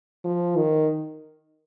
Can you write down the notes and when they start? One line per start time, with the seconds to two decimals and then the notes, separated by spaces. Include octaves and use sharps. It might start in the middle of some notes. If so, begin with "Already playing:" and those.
0.24 F3
0.56 D#3